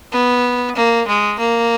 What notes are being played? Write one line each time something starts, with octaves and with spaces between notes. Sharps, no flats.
B3
A#3
G#3
A#3